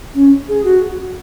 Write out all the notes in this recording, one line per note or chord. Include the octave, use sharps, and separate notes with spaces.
C#4
G#4
F#4